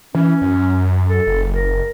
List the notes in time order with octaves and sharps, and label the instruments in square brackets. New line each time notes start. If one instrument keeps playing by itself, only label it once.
[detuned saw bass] E3 [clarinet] C#4
[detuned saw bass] F#2
[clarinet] A4
[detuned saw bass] F#1
[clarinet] A#4